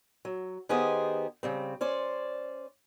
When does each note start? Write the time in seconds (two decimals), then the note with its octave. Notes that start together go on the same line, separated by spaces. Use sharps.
0.25 F#3
0.69 D#3 B3 G4 G#4 C5 D#5
1.43 C#3 G3 C4
1.81 C#4 C5 D5